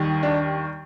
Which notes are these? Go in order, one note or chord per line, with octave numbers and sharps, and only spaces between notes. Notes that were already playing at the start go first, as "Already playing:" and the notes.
Already playing: D#2 D#3 G3
D4